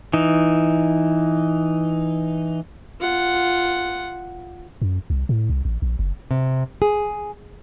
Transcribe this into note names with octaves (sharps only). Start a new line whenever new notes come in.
E3 D#4
F4 F#5
F#2
C2
A2
C2
A1
A#1
F#1
C3
G#4